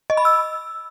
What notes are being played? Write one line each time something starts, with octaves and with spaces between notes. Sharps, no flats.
D#5
B5
E6